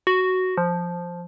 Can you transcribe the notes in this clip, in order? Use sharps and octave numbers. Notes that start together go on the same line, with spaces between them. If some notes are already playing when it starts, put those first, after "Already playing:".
F#4
F3